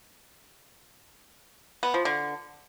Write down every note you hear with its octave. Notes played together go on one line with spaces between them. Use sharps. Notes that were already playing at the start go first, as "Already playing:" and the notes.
B3
F3
D3